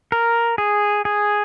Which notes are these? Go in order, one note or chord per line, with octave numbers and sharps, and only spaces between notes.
A#4
G#4
G#4